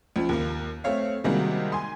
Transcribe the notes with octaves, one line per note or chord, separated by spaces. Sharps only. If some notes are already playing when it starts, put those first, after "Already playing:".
C#2 F3
D#2 A#3
A3 C4 C#5 F5
C3 D#3 G3 G#3 A#3 F#4
G#5 C6